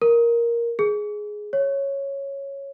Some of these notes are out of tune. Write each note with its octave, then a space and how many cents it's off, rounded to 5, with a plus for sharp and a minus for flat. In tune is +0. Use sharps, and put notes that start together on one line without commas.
A#4 +5
G#4 +10
C#5 -5